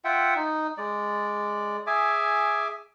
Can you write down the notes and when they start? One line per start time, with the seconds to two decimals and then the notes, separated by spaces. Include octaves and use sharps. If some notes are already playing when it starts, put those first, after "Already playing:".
0.05 F4 E5 F#5 G5
0.36 D#4
0.78 G#3 D5
1.87 G#4 E5 G#5 D6